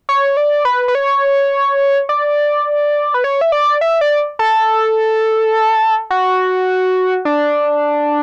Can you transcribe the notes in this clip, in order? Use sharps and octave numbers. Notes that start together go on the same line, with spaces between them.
C#5
D5
B4
B4
C#5
D5
B4
C#5
E5
D5
E5
D5
A4
F#4
D4